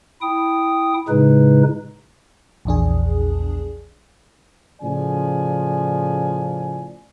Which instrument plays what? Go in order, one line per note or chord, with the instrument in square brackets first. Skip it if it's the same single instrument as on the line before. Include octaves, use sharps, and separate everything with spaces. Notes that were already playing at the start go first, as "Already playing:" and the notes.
[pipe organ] E4 G5 D#6
A2 C#3 G#3 D#4 B4
[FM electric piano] A#1 E2 D4 G#4
[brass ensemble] A2 C#3 F3 D5 G#5